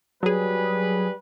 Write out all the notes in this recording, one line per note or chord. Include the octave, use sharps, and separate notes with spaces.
F#3 G3 G#4 B4